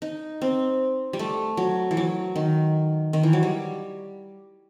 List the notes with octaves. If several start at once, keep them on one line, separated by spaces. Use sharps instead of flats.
D#4
C4
G3
A3
F#3
E3
F#3
D#3
D#3
E3
F#3
G3